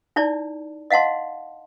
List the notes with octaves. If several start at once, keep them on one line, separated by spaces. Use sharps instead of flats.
D#4 E4 C#5 D5 A5
D#5 F5 F#5 A5 C6